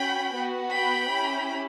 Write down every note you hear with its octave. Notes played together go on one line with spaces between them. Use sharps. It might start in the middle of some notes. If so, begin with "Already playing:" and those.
Already playing: C#4 F#4 G5 B5
B3 F#4
G5 B5
C#4 E4 G4